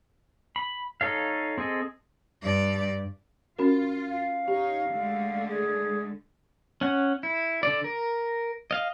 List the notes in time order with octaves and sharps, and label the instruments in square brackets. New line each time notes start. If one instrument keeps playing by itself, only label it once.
[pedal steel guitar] B5
D#4 A4 C#5 F5
C4 G#4 A4 D#5
[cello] G2 D5
[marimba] C#4 F#4 A#4 [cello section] F4
[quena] F5
[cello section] D#4 C#5 [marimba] G4
[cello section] D3 G#3 A3
[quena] G#4
[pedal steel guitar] C#4 F#5
E4
D3 D5
A#4
D#5 F5